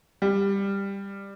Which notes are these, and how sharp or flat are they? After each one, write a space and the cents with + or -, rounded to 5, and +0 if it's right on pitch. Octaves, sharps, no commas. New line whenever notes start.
G3 +15